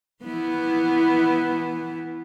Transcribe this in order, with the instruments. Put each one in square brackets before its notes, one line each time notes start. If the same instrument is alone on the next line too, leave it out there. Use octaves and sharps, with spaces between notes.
[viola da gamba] E3 B3 E4